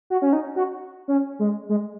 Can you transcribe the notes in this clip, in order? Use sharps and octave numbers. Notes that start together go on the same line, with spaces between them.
F#4
C#4
D#4
F#4
C#4
G#3
G#3